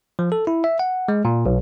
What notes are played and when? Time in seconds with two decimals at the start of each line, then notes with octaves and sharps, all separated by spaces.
0.19 F3
0.32 A4
0.47 E4
0.64 E5
0.79 F#5
1.08 G#3
1.25 A#2
1.46 B1